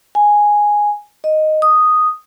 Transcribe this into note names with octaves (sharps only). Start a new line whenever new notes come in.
G#5
D#5
D#6